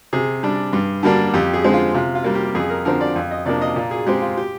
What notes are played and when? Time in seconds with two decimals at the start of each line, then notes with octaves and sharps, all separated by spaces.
0.13 C3 G#4
0.43 G3 D4
0.73 G2
1.03 D3 G3 A#3 D4
1.34 F2 G4
1.54 G#4
1.64 D3 G#3 C4
1.74 F4
1.94 C3 F4
2.15 F4
2.24 G3 A#3
2.35 G4
2.55 F2 G#4
2.70 A#4
2.85 D3 F3 C4 A#4
3.01 D5
3.16 F2
3.31 D#5
3.46 C3 F3 A#3 D4 D5
3.62 D#5
3.76 A#2 D5
3.91 G#4
4.06 G#3 C4 G4
4.22 F4
4.37 G4